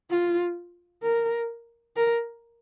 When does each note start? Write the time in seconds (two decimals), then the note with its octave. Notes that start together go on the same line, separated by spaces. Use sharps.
0.10 F4
1.03 A#4
1.96 A#4